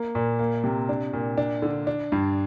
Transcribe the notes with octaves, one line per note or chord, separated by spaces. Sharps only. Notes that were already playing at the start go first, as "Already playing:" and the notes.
Already playing: A#3
A#2
A#3
C3
D4
A#2
D4
D3
D4
G2